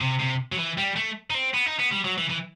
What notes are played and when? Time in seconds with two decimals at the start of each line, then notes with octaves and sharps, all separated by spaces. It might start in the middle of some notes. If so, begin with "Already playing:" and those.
0.01 C3
0.20 C3
0.52 F#3
0.58 E3
0.78 G3
0.96 A3
1.30 D#4
1.34 C4
1.54 B3
1.66 D#4
1.79 B3
1.92 G3
2.04 F#3
2.18 E3
2.30 E3